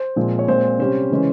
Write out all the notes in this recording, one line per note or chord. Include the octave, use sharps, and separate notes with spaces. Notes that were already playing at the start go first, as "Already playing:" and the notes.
Already playing: C5
A#2 F3 G#3 C4
C#5
A#2 G#3 C4 C5
C3 G3 C#4 C5
C#3 E3 G#3 C#4